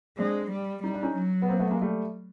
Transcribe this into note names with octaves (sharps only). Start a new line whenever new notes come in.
G#3 C4 D4
G3
G3 D#4
D4
C#4 D#4
F#3
B3
A#3 C4
A3 B3
G#3 A#3
G3 A3